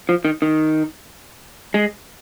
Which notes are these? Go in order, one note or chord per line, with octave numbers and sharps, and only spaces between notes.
F3
D#3
D#3
G#3